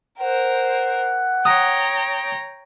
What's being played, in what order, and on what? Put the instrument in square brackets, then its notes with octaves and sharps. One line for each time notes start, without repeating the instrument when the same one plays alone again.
[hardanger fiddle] A#4 C5 [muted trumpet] F#5
[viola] C#5 A#5 [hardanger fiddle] G5 [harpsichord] D#6